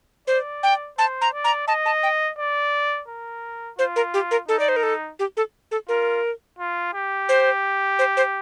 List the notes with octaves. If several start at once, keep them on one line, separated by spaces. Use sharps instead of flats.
C5 D5
G5
C5 A5
A#5
D5
A#5
D#5 A5
A5
G5
D5
A#4
F4 C5
A#4
G4
A#4
D#4 A4
D5
C5
A#4
A4
G4
A4
A4
F4 A#4
F4
G4
C5
C5
C5